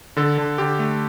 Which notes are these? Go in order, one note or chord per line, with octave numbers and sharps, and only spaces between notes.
D3 A4
D3
D3 G4
A3